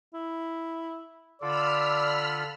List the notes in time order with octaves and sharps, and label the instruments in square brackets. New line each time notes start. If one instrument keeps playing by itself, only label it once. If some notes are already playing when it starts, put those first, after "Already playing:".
[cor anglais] E4
[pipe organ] D3 F4 A4 [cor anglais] D5 [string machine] B5 E6 F6